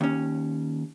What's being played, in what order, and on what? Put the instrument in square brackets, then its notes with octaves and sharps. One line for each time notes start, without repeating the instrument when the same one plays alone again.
[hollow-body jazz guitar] D#2 C#4